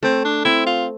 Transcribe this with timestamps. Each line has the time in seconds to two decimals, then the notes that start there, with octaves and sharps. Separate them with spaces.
0.03 A3 C4
0.25 D4
0.45 C4 E4
0.66 F4